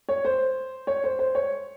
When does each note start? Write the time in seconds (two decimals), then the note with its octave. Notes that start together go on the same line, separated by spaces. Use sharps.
0.09 C#5
0.25 C5
0.87 C#5
1.04 C5
1.19 C5
1.35 C#5